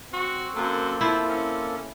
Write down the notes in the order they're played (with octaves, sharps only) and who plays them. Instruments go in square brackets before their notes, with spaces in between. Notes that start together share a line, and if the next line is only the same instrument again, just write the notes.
[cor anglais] C4 [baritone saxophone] F#4
[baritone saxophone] F#2 [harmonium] A#3 A4
[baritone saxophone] F3 [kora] E4
[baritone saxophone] C#4